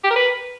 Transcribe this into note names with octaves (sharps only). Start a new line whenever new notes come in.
G4
A#4
B4